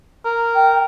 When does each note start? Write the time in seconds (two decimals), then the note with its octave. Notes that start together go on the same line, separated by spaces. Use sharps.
0.25 A#4
0.54 G5